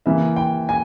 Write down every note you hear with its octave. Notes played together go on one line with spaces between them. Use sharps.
C#3 E3 A#3 E5
G5
G#5